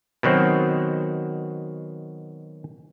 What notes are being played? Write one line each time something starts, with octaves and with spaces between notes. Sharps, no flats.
B2 D#3 F#3 C4